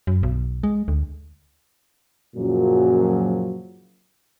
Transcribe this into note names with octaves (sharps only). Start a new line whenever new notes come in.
F#2
B1
G#3
D2
F#2 A#2 C#3 F3 F#3 F#4